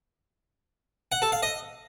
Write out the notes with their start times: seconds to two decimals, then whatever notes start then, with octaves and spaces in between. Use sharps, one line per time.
1.12 F#5
1.22 A4
1.32 F5
1.43 D#5